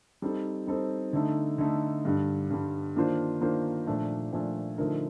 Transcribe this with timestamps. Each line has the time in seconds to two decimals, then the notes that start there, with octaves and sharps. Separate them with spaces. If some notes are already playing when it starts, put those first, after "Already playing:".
0.22 G3 C4 D#4 A4 C5
0.67 G3 C4 D#4 A4 C5
1.13 D3 A3 D#4
1.58 D3 A3 D#4
2.05 G2 D3 G3
2.50 G2 D3 G3
2.96 D#3 A#3 D4 F4 C5
3.41 D#3 A#3 D4 F4 C5
3.87 A#2 F3 A3 D4
4.32 A#2 F3 A3 D4
4.78 D3 F3 A3 D#4 A#4